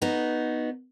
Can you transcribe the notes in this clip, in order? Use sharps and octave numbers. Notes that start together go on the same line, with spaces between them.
B3 D#4 F#4